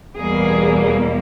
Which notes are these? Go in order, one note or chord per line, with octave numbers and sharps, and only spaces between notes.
E2 B2 G3 A#3 G#4